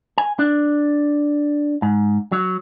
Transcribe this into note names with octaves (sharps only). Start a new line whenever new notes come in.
G#5
D4
G#2
F#3